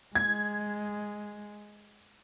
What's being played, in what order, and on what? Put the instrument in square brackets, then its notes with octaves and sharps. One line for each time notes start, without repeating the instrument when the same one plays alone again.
[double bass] G#3 [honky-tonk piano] G#6